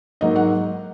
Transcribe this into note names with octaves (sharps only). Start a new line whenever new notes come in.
G#2 F#3 A#3 D#4 D#5
F#5